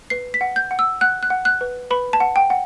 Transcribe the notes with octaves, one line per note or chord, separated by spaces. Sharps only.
B4 C7
B6
F#5
G6
F#5
E6
F#5 F#6
F#6
F#5
F#6
B4
B4 B5
A5
F#5
G5
F#5